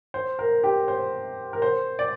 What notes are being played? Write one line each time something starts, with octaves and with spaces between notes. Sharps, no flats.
C5
A#4
G4
C5
A#4
C5
D5